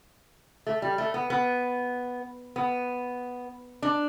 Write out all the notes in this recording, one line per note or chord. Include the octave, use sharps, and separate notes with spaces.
A3
G3
A3
B3
B3
B3
D4